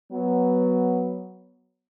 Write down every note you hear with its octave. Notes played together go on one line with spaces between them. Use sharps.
F#3 B3